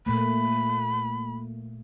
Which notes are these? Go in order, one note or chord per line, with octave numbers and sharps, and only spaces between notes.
A#2 A3 A#3 B5